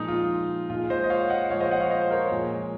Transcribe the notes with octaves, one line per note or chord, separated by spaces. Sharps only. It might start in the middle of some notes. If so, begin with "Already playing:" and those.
Already playing: A#2 F3 G#3 D#4
F4
A#2 G#3 F4
C5 D#5
D#5
C#5 F5
D#5 F#5
A#2 F3 G#3 C#5 F5
C5 D#5
D#5 F#5
C#5 F5
C5 D#5
C5
A#4 C#5
A#2 F3 G#3